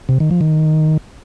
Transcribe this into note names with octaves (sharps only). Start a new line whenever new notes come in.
C3
D#3
F3
D#3